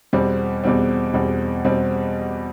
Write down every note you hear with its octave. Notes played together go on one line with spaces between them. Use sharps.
E2 B2 G3 C4
E2 B2 G3 C4
E2 B2 G3 C4
B2 G3 C4